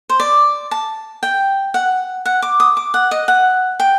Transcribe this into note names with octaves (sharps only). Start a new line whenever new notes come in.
C5
D5
A5
G5
F#5
F#5
D6
D#6
D6
F#5
D#5
F#5
G5